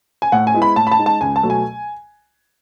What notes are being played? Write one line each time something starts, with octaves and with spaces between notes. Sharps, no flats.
G#5
A2 F#5
G#5
G#3 B3 E4
B5
A2 A5
B5
A5
G#3 D#4
A5
C#2 G#5
A5
B2 F#3 A3
G#5